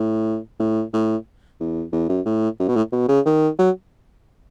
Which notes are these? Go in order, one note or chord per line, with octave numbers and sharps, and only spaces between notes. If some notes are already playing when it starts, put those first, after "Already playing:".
Already playing: A2
A2
A2
E2
E2
F#2
A2
F#2
B2
A2
B2
C#3
D#3
F#3